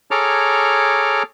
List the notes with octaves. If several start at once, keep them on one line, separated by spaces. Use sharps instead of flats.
G#4 A4 C#5 A#5 D6 F6